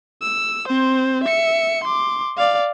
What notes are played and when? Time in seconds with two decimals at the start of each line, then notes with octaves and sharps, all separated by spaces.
0.22 E6
0.68 C4 C5
1.23 E5 C#7
1.83 C6 D6
2.37 D5 F5